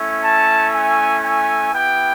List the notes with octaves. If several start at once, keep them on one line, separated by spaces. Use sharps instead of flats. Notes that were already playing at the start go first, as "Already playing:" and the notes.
Already playing: A3 C#4 E4
A5
G#5
G#5
B3 E4 G4 G5